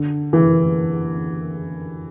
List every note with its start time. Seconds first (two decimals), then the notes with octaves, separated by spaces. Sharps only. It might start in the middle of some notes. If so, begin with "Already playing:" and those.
Already playing: D3
0.33 E3